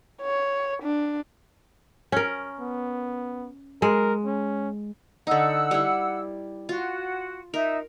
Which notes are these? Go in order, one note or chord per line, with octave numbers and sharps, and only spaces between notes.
C#5
D4
C#4 A#4
B3
G#3 A#4
C#4
D3 D#4 F#5 E6
G3 E4
F4 F#4
D#4 A#4 E5